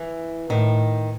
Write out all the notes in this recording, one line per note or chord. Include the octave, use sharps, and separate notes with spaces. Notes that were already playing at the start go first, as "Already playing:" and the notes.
Already playing: E3
A2 D#3